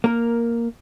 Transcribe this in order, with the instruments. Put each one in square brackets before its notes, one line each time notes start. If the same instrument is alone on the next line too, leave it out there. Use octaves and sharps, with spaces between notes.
[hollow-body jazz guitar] A#3 A#4